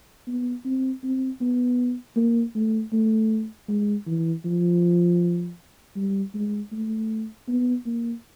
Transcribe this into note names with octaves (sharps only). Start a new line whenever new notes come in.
B3
C4
C4
B3
A#3
A3
A3
G#3
E3
F3
G3
G#3
A3
B3
A#3